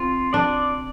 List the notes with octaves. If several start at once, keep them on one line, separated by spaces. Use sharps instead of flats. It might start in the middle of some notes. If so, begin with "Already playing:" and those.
Already playing: C4 F4
D4 D5